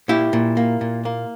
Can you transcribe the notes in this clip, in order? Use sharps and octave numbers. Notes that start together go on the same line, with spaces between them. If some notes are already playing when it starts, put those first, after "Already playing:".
A#2 E4 G4
A#2
A#3
A#2
A#3